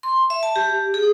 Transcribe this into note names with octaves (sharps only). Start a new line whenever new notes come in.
C6
E5
A5
G4
G#4